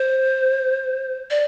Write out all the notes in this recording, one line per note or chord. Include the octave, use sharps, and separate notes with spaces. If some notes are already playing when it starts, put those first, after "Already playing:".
Already playing: C5
D5